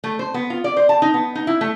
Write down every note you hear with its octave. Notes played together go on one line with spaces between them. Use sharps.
A3
C5
B3
F4
D5
C5
A5
D#4
B3
D#4
E4
A3